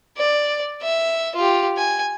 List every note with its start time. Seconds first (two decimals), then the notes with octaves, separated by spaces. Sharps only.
0.17 D5
0.82 E5
1.35 F4 G4
1.77 G#5